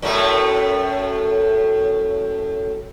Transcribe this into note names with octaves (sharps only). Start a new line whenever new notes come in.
F#2 A2 A3